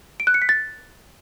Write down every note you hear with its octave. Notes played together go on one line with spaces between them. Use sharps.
D7
F#6
C#7
B6
A6